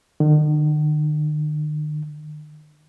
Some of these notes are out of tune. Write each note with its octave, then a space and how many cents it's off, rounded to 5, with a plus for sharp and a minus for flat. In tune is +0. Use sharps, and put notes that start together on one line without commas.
D#3 -45